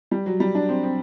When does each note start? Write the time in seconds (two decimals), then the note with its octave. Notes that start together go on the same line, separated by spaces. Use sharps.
0.11 G3
0.26 F#3
0.40 G3
0.55 D4
0.69 C4
0.83 C4